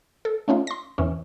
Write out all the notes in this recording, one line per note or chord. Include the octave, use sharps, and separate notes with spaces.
A4
A3 C#4 D#4 F4
C6 A#6
E2 E3 C#4